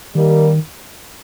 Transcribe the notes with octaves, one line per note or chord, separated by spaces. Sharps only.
D#3 G3 A#3 D#4 G4 A#4